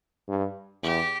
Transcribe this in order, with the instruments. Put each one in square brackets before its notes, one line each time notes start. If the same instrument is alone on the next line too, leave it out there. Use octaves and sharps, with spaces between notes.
[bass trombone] G2
[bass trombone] E2 [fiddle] G4